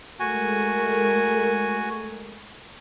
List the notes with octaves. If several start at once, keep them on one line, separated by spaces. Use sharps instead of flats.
G#3 A3 F#4 A#4 G#5